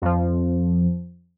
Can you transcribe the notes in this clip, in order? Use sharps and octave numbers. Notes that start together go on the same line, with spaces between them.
F2 F3